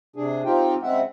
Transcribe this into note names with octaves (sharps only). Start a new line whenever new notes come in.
C3 D4 G#4
C4 D#4 F4 G4 G5
C#3 G#3 C4 E5 F#5